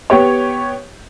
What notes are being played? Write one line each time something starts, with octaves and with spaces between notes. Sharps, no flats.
B3 G4 C#5